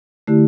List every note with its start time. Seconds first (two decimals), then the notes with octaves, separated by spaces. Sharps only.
0.27 D3 A3 E4 G4